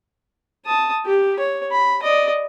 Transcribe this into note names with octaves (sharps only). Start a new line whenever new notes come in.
A5 D#6
G4
C#5
B5
D5 D#5